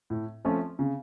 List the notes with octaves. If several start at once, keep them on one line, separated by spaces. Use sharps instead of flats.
A2
F3 A3 C#4 F4
C#3